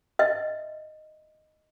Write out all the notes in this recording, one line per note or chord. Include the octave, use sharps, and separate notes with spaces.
D#5 E5